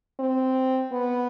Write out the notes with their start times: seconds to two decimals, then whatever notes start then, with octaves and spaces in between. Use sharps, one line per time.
0.20 C4
0.93 B3